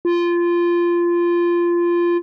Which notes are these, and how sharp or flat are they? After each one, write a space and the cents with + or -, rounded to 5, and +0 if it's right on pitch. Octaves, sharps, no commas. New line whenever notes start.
F4 -15